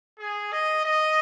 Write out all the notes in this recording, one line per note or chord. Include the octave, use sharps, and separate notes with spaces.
G#4
D#5
D#5